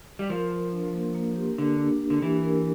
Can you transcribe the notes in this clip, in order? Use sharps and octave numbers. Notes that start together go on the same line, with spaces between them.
G3
F3 A#4
A#4
D4
A#3
A#3
G4
D3 D4
D4
D4
D3
E3 G4
A#4